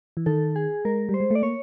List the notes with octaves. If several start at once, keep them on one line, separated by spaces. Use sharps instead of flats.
E3
D#3 A4
G#4
G#3 A#4
G3
C5
G#3
A3 D5
A#3 C#5